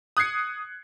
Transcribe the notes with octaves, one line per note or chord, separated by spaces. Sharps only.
D#6 F#6 G#6 C7 C#7